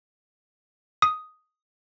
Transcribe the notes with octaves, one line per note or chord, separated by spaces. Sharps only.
D#6